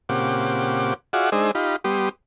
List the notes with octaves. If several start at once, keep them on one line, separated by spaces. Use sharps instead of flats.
A#2 C#3 C4 G4 F#5 D6
F4 F#4 G#4 D5 E5 F#5
G#3 D4 D#4 G#4 C5 E6
D#4 F4 G4 B5
G3 B3 G4 C6 D#6